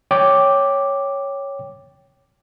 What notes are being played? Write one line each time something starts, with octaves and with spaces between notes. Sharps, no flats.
C#5 G5 D6